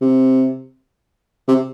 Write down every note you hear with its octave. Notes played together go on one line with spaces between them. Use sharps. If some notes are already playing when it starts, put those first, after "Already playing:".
C3
C3